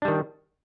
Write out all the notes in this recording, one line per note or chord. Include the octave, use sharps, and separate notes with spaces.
D#3 G3 D4